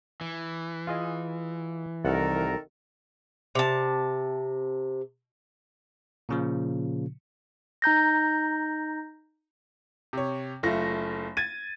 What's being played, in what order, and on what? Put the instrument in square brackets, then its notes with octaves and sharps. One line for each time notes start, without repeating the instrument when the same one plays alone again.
[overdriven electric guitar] E3
[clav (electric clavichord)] F4 G#4 D#5
[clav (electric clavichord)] C2 F#5 [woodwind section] D#3 A4 A#4
[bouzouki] C3 A5
[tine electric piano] A#2 C#3 F3
[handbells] D#4 A#5 G6 A#6
[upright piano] C3 C#5
F#1 A3 F4 A#6
G#6 A6 D#7